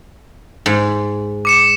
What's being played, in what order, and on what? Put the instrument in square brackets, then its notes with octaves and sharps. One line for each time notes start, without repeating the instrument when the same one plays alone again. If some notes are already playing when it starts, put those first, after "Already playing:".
[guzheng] G#2
[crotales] D6 C#7 E7